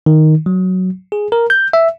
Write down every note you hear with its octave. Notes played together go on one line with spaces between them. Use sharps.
D#3
F#3
G#4
A#4
G6
E5